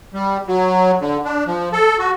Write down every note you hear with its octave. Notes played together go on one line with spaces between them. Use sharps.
G3
F#3
D3
D4
F3
A4
F#4